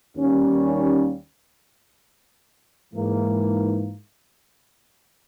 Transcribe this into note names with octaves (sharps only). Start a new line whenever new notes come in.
D#2 D#3 G3 A#3 C#4
G#2 E3 A#3